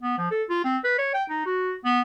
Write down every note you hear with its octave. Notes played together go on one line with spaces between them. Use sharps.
B3
F3
A4
F4
C4
B4
C#5
G5
D#4
F#4
B3